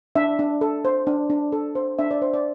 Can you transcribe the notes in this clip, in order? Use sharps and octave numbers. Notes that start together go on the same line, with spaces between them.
D4 E5
D4
A4
C5
D4
D4
A4
C5
D4 E5
D5
C5
D5